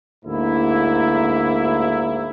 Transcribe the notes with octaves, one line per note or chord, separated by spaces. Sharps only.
D2 G#2 A#3 E4